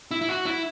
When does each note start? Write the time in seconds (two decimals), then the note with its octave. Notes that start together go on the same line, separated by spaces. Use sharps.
0.11 E4
0.22 E4
0.29 F#4
0.46 E4